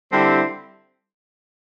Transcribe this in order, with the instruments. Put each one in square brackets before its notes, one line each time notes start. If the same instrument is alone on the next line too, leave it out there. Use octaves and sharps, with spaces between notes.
[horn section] D3 G3 C4 E4 G4